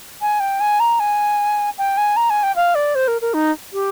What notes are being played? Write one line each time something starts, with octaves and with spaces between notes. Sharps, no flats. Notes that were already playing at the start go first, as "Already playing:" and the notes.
G#5
G5
G#5
A#5
G#5
G5
G#5
A#5
G#5
G5
F5
D5
C5
A#4
A#4
D#4
G4